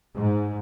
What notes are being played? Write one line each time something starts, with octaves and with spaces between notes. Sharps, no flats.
G#2